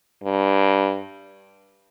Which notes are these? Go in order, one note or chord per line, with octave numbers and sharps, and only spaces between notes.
G2